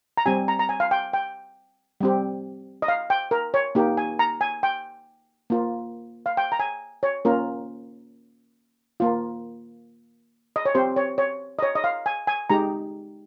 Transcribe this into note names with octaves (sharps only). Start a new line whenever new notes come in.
A#5
G3 C4 G4 G#5
A#5
A#5
G#5
F5
G5
G5
G3 C4 G4
D#5
F5
G5
A#4
C#5
A#3 D#4 G4
G#5
A#5
G#5
G5
A#3 F4
F5
G5
A#5
G#5
C#5
A#3 C#4 F4 A#4
A#3 F4
D#5
C#5
C4 G4 C5
C#5
C#5
D#5
C#5
D#5
F5
G#5
G#5
G#3 D#4 G4 A#5